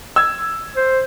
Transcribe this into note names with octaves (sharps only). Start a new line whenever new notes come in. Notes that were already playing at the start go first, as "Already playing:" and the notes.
E6 G#6
C5